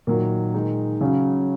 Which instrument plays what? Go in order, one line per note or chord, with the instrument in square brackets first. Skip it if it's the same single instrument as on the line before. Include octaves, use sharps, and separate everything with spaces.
[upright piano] A#2 [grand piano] D#3 F#3 A#3
[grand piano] D#3 G#3 D#4
[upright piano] C#3 [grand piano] F#3 C#4